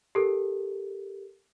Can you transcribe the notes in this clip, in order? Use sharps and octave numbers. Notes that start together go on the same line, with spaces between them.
G4 A4 A#4